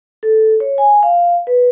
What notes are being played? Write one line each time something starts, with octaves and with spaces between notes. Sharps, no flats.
A4
C#5
G#5
F5
B4